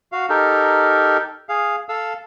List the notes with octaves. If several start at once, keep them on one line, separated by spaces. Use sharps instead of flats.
F#4 F5
D#4 G4 A4 A#4
G#4 F5
A4 F5 E6